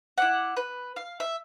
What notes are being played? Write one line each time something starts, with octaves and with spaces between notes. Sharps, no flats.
E4 D5 F#5
B4
F5
E5